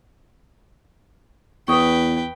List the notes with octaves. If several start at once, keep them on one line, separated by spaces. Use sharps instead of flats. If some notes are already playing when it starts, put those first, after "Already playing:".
E2 B4 G5 C#6 D#6